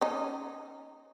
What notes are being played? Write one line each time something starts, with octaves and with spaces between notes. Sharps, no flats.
C#4 D#4